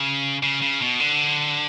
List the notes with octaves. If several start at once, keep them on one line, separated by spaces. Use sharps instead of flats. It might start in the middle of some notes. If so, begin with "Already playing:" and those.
Already playing: C#3
C#3
C#3
B2
D3